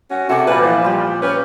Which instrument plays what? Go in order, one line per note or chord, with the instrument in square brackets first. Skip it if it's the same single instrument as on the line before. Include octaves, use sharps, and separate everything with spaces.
[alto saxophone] C#4 [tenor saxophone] F#4
[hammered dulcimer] C3 G#4 D5 [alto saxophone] F#4 [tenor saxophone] A4
[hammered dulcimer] A#2 G3 [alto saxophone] B4
[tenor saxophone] E3 [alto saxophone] F3
[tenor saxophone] G3 [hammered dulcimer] F4 G4
[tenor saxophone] C#4 [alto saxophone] B4 [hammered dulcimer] G5